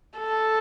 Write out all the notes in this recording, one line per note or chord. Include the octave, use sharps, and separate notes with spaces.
A4